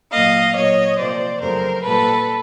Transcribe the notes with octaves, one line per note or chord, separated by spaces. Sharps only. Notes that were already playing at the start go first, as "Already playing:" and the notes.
A#2 F#3 A#3 D#5 F5
A#2 F#3 A#3 C#5 D#5
C3 F3 A#3 C5 D5
F2 C#3 F#3 A3 A#4 C5
A#2 G3 A#3 A4 B4